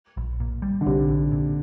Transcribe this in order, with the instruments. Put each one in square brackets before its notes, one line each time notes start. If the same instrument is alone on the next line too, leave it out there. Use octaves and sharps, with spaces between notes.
[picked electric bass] A#1
A#2
G3
[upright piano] D3
[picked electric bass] A#1 [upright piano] C3
[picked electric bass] A#1
A#2